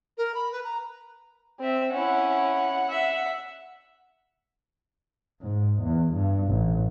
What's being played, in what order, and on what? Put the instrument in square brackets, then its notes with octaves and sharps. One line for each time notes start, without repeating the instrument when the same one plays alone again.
[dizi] A#4
B5
B4
A#5
[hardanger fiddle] C4 E5
[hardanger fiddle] C#4 E4 [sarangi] F#5
[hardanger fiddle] E5
[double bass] G#2
E2
G2
A1